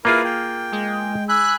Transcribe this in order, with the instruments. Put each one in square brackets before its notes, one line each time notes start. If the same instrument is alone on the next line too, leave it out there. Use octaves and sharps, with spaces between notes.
[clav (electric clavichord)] A#3 F4 G#4 [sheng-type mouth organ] E4 A#4 B4
[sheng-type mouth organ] G5
[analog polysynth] G#3
[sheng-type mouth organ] G#5 B5 [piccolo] E6 [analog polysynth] F#6